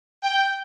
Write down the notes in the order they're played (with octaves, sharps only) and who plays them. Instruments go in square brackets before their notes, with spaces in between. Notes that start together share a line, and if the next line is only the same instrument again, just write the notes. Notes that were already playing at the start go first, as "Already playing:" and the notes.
[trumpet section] G5